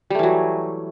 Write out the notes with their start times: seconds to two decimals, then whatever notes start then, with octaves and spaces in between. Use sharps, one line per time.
0.10 G3
0.15 A3
0.19 E3
0.23 F#3